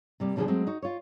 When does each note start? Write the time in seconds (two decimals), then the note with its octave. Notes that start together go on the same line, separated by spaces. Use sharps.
0.20 C3 G3 A#3
0.36 D#2 B2 D3 F3 G3 G#4
0.48 F#3 G#3 A3 C4 F#4
0.67 D#4 F#4
0.82 F4 C#5